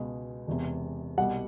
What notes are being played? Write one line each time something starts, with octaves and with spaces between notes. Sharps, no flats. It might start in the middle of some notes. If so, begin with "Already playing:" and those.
Already playing: C#2 B2 G#3
E1 E2 C3
C2 B2 G3 F#5